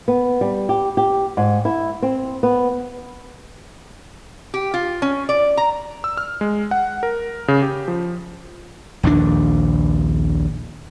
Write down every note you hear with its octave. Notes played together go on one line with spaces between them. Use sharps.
B3
G3
G4
G4
G#2
E4
C4
B3
G4
F4
C#4
D5
A#5
E6
F6
G#3
F#5
A#4
C#3
G4
F3
A#1 D#2 D#3 D4